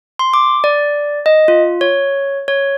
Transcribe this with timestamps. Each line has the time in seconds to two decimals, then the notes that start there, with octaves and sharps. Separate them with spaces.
0.19 C6
0.34 D6
0.64 D5
1.26 D#5
1.48 F4
1.81 C#5
2.48 C#5